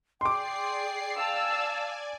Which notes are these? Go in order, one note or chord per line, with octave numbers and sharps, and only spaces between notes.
G#4 D5 G5 C6 D6 C7
D5 F5 G#5 A5 E6